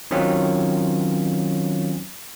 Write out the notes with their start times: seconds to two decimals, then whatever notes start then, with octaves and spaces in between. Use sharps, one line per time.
0.11 D#3 F#3 C4 C#4 F4